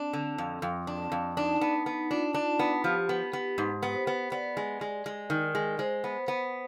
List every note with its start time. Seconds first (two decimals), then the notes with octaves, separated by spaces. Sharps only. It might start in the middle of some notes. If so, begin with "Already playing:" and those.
Already playing: C4 D4
0.13 D3
0.38 F2
0.62 F2
0.87 D4
1.12 F2
1.37 D4 D#4
1.61 B3
1.86 B3
2.11 D4 F4
2.34 D4
2.59 B3
2.84 F3 G4
3.09 B3
3.33 B3
3.58 G#2
3.83 B3
3.95 C5
4.07 B3
4.32 B3 D5
4.57 G#3
4.81 G#3
5.06 G#3
5.30 D#3
5.55 G#3
5.79 G#3 C5
6.04 B3
6.28 B3